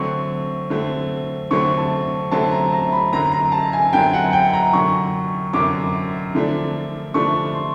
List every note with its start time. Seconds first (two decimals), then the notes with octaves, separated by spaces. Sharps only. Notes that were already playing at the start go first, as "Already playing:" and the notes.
Already playing: D3 F#3 A3 C4 C#6
0.70 D3 F#3 A3 C4
1.51 D3 F#3 A3 C4 C#6
1.78 A5
2.31 D3 F#3 A3 C4 A5
2.51 A#5
2.73 A#5
2.92 B5
3.13 F#2 D3 F#3 A#5
3.32 A#5
3.52 A5
3.73 G#5
3.93 F#2 D3 F#3 G5
4.13 F#5
4.33 G5
4.53 A#5
4.73 F#2 D3 F#3 C#6
5.53 F#2 D3 F#3 D6
6.35 D3 F3 A3 D4
7.14 D3 F3 A3 D4 C#6
7.55 C6